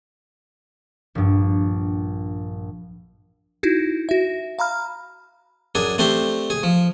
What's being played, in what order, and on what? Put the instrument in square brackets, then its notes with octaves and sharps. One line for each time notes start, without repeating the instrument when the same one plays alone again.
[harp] A#1 G2
[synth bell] D#4 E4 F#4
F#4 E5
F5 A#5 B5 F6
[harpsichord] F#2 D4 G#4
A3 C4 D4 G4 C6
G#4
F3